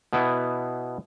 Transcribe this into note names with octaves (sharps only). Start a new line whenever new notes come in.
B2 B3 E4